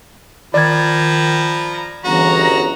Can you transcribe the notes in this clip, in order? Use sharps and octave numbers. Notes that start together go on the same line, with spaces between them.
D#3 F3 D5 A#5 B5 G#6
G1 C#3 E3 F#4 A#5